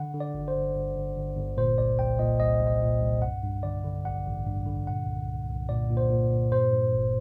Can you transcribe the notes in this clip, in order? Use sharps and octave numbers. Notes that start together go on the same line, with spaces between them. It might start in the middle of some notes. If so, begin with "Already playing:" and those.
Already playing: D3 F#5
D3
D5
G1
C5
G1
G1
G1
G1
G1
A#2 C5
C2 D5
C2 G5
A#2 D#5
C2 D#5
C2
D#5
A#2
C2
G2 F#5
G2
D3 D5
D3
A1 F#5
A1
G2
D3
A#2 F#5
C2
C2
C2
A#2 D5
A#2
C5
A#2
A#2
G2 C5
G2
G1